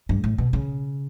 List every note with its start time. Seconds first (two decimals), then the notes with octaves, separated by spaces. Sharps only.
0.09 G2
0.24 A2
0.38 B2
0.53 C#3